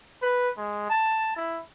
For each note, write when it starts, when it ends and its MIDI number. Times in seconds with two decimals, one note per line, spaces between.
0.22 0.49 71
0.58 0.88 56
0.90 1.32 81
1.36 1.59 64